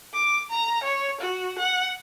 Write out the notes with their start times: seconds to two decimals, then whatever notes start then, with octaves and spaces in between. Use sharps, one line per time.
0.14 D6
0.51 A#5
0.84 C#5
1.21 F#4
1.59 F#5